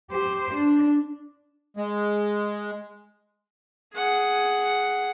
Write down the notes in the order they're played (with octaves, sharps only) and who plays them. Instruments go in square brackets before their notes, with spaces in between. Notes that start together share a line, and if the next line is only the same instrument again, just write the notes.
[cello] G4 C5
D4
[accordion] G#3
[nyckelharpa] G#4 F#5